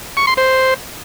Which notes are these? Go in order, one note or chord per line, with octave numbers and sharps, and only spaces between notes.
C#6
C6
C5